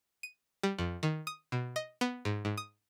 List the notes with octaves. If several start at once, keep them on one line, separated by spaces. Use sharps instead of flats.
D#7
G3
F2
D#3
D#6
B2
D#5
B3
G#2
G#2
D#6